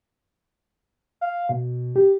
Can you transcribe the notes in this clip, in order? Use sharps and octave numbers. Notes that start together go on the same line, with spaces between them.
F5
B2
G4